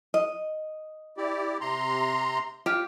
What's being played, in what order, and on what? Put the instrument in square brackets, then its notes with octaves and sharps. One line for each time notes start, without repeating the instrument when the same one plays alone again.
[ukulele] D#5
[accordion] E4 G4 D5
C3 A#5 C6
[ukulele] F4 G4